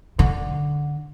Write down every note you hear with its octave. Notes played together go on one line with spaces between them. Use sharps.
D3